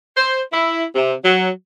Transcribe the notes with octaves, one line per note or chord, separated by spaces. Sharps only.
C5
E4
C3
F#3